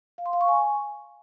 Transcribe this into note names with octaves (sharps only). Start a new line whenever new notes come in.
F5
C6
F5
C#6
G#5